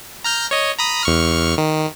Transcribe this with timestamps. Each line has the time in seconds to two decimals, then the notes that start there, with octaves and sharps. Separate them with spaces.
0.24 A#5 F6 G6
0.51 C#5 D#5
0.79 A#5 B5 D#6
1.03 E2 C#6 F6
1.58 D#3